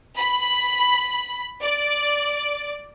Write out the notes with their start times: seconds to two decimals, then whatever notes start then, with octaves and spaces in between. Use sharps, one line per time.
0.18 B5
1.63 D5